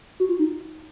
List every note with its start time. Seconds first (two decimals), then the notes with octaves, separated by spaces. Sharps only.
0.20 F#4
0.29 F4
0.39 D#4